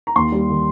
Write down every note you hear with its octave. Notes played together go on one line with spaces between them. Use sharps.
A#5
D#2 C6
G3
D#3